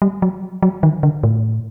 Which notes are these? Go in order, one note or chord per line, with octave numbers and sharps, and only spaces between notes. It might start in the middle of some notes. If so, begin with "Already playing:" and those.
G3
F#3
F#3
D#3
D3
A2